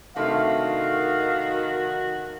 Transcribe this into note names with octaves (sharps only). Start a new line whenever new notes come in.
C3 D#3 A3 D4 F#4 F5